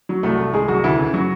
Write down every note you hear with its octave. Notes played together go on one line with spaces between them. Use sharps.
F#3
C2 A3 A4
C2
C2 G#3 G#4
C2 F#3 F#4
D2 E3 E4
C#3
F#3 F#4